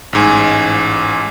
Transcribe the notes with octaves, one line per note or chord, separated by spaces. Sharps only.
A1 G#2 G#5